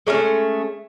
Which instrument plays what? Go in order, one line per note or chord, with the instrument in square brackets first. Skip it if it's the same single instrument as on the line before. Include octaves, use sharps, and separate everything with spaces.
[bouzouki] G#3 A3 B3 C#4